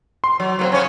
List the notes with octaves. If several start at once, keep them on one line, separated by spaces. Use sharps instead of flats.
C6
F#3
F#3 A#3 C4
C#3 C#4 C#5